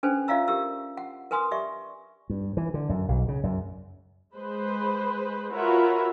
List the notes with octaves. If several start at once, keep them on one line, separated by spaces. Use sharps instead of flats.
C#4 D4 A4 B4 C5 G#5
F4 D5 E5 F5 A#5 E6
G4 A#4 E6
F#5
A#4 B4 G#5 C6 D#6
G4 D5 E5 C#6
G2
E3
D3
F#2
B1
C#3
F#2
G#3 B4 C5
F4 F#4 A#4 B4 C#5 E5